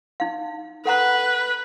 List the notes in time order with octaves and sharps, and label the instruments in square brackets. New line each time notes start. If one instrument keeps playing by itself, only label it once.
[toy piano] D#4 F5
[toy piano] A4 F#5 A#5 [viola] B4